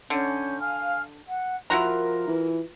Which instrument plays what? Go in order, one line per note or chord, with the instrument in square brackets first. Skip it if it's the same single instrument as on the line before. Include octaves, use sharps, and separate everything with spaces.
[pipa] D3 [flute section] C#4 G6
[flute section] F5 G#5 F6
F#5
[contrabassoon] F3 [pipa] E4 F#4 A#5 [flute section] A#4 [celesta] C6 F6 F#6
[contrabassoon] E3 [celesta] F4 B4